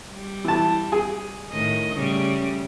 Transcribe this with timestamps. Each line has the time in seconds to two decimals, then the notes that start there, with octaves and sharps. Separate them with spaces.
0.12 G3
0.44 E3 A5
0.92 G#4
1.51 A2 D#3 D#5
1.95 C#3 G3 A3